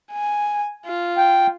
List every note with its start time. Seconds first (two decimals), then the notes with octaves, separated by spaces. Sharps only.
0.12 G#5
0.86 F4
1.18 G5